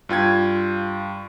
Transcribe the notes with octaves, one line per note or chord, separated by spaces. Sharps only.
G2 F4 G5 G#6